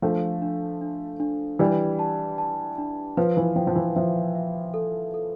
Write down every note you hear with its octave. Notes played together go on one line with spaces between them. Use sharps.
F3 A3 D4
D4
D4
D4
E3 G3 D5
A5
A5
D4
F3 B4
E3
F3 G5
F3
E3
F3 E5
E5
A4
A4